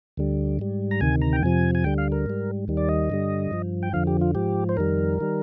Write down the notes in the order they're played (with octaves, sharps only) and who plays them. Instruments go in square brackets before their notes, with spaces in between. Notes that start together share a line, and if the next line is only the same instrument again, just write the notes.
[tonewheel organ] D2 D3 G3
G#2 G3
A#5
D2 C3 D#3 G#5
A#5
G5
F2 C3 F3 G#5
G#5
D2 D3 G3 G5
F5
A#4
G#2 G3
D#2 D#3 G3
D5
D#5
G2 D3 G3
G2 F3
G5
F2 D3 F3 F5
G4
F4
G#2 F3 G4
C5
F2 D#3 G3 A#4
D#3 G3